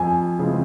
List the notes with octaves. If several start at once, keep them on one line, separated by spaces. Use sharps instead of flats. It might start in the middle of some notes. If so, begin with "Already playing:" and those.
Already playing: F2 G#5
C#3 E3 G#3 C4